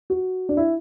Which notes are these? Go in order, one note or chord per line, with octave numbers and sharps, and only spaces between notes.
F#4
D4
E4